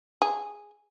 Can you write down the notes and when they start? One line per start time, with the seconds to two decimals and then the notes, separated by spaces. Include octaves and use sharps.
0.22 G#4